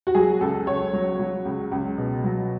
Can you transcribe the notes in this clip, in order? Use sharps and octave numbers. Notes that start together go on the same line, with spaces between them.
F#4
F#3 G#4
C#2 A4
C#2 C#5
F#3
F#3
C#2
C#2
B2
F#3